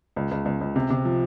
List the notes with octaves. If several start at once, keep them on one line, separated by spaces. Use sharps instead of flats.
C#2
C#2
C#2
C#2
C3
C3
F3